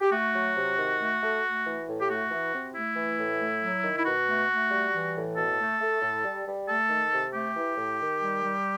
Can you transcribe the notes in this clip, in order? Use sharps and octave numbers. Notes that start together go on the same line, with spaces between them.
G4
A3 F#4
F#3
C3
D#3
A3
A3
A3
E3
A2
G4
A3 F#4
E3
C3
A3 E4
E3
A2
A3
F#3
D#3
E4
B2 F#4
A3
A3
G3
E3
A2
B2 A4
A3
A3
A2
G3
G3
A3 A4
D#3
C3
A3 G4
E3
A2
D#3
G3
G3